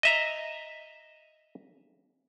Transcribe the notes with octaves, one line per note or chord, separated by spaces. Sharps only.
D#5 E5 A#5